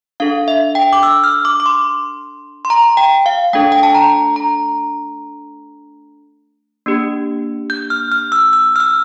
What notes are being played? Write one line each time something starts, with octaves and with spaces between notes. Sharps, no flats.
D4 A4 F5
E5
G5
D6
E6
F6
D6
D6
C6
C6
A#5
G5
F5
A3 D4 A4 G5
G5
A5
A#5
A#5
A#3 D4 G4
G6
F6
F6
E6
E6
F6
E6